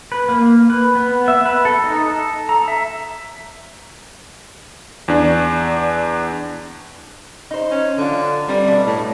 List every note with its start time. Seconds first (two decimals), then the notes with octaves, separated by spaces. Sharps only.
0.12 B4
0.29 A#3
0.70 B4
0.95 B3
1.28 E5
1.46 B4
1.65 A4
1.84 D#4
2.08 A4
2.49 A#5
2.68 E5
5.08 E2 D4
7.51 D#4 C5
7.71 C#4
7.98 D3 F#3 F4
8.48 G3 C4 A#5
8.67 B2 D4 E5
8.86 A2